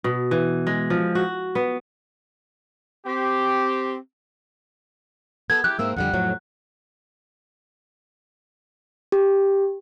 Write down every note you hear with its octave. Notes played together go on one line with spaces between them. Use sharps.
B2
E3
G#3
F3
F#4
B3
C4 G4
B3 A4 G#6
E4 G4 F#6
G#2 A#3 C4 E5
F2 D3 G3 F#5
F2 A2 F#3
G4